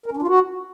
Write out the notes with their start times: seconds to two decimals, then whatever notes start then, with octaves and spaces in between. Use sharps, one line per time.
0.06 A#4
0.12 C#4
0.17 D4
0.22 F4
0.28 F#4